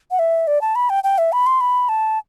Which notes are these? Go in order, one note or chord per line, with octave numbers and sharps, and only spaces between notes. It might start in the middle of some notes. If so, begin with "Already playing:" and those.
F#5
E5
D5
A5
B5
G5
G5
E5
B5
C6
B5
A5